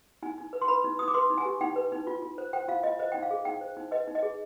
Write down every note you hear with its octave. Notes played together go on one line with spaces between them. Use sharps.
D#4 G#5
D#4
B4
C6
B4 B5
D#4
D#4 D#6
D6
B4 C6
D#4
G#5
G4
D#4 G5
B4
D#4
F4
F4
C5
C5 G5
F4 F5
F4 D#5
C5 D#5
D#4 G5
F5
G#4
D#4 G5
C5
D#4
B4 D#5
D#4
D#5
G#4